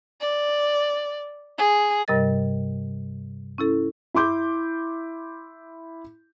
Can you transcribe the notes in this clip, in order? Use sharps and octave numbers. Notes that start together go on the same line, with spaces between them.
D5
G#4
G2 C3 G3 A#4 D#5 A6
C#4 E4 A4
E4 C6 D6 G6